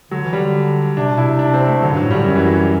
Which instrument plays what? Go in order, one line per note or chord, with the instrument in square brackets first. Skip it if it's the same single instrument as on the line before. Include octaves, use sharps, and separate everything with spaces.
[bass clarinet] D3 [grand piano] F#3
[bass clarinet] E3
[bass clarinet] D3 [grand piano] G3
[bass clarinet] C3 [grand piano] D4
[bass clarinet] B2
[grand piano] E4
[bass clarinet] C3
[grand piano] D4
C4
A3
[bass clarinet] D3 [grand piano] F#3
[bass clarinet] G2 [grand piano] F#3
[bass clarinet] A2
[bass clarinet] D3 [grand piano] G3
[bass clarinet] F#2 [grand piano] F#3
[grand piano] E3
F#3
G3